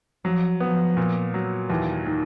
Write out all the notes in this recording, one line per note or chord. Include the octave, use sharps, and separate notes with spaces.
F3 F#3
F3 B3
A#2
F#3
D#2 E3
D#3